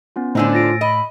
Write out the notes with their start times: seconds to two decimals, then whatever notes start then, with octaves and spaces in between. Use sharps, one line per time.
0.16 B3 C#4 F4
0.35 A2 D3 D4 D#4 C5 G#5 E6
0.53 F4 A6 A#6 D7
0.81 D#5 B5